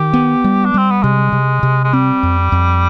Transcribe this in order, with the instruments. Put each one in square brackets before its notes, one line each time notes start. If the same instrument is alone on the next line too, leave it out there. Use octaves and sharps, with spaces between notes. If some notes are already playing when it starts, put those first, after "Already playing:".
Already playing: [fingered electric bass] D#3 [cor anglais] G4
[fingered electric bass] B3
G3
[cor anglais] D4
[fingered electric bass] G3 [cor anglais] C4
[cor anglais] B3
[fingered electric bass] C3 [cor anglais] G#3
[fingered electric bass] C3
C3
[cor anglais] G#3
[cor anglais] G3 [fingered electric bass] C4
[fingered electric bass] F2
F2